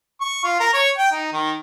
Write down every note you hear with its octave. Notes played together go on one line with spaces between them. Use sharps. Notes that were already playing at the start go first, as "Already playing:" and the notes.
C#6
F4
A#4
C#5
G5
D#4
D#3